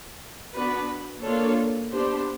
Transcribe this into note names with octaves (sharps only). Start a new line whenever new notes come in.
B3 D4 F#4 B4
A#3 D4 F4 A4 C#5
B3 D4 G4 C5